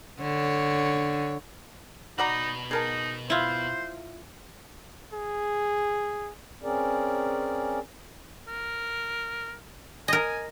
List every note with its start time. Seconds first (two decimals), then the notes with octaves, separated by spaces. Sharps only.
0.21 D3 C#5
2.18 B2 D#4 F#4 D5 A#5 B5
2.71 D#4 G#4 A#4 A5
3.30 E4 F4 C5
5.14 G#4
6.63 C4 C#4 G#4 A#4 D5
8.48 A#4
10.08 A#4 D#5 G#5